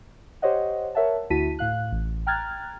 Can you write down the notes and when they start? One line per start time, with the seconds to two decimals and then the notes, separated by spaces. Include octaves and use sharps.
0.42 G4 C5 C#5 D#5 F#5
0.95 A#4 C#5 E5 F#5 A5
1.30 D2 E4 F#4 A5 B6 D#7
1.59 A2 F5 F#6
1.92 A1
2.27 G5 A#5 F6 F#6 G#6 A6